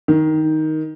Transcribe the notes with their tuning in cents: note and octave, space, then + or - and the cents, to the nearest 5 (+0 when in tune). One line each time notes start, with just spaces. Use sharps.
D#3 +5